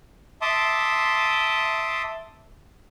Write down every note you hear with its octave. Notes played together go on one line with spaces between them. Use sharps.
E5 A5 C6 D6 D#6